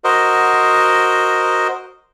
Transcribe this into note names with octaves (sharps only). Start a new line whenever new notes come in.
F#4 A#4 C5 D#5